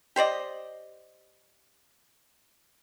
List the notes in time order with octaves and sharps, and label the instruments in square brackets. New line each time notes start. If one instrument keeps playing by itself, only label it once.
[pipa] G4 C5 D5 D#5